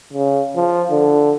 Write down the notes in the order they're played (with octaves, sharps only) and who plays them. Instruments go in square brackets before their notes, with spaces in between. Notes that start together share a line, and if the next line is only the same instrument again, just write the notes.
[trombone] C#3
F3
D3